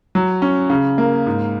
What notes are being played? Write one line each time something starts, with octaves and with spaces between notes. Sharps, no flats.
F#3
C#4
C#3
A#3
G#2